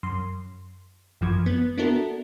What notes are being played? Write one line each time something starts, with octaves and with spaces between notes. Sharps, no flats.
F#2 C6
A1 F#2 E3 F3 G#6
B3
B3 D4 E4 F#4 A4 A#4